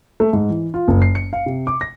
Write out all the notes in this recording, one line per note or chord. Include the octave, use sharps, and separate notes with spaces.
A3
G#2
E3
F4
F#1
C7
C#7
F5
C3
D6
A#6